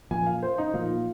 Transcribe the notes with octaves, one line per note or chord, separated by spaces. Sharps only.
A#2 F3 A#3 G#5
F5
C5
D#4
A#2 F3 A#3 F4